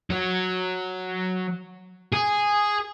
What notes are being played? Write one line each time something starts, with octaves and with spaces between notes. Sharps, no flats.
F#3
G#4